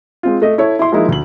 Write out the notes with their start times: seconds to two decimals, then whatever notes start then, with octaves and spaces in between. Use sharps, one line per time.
0.23 G#3 C4 F4
0.42 A3 D#5
0.58 E4 A4 C#5
0.79 E4 C6
0.92 F3 G#3 A#3 D#4 E4
1.08 D2 F#7